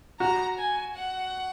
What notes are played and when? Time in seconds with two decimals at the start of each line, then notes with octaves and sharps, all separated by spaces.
0.20 F#4 A#5
0.58 G#5
0.95 F#5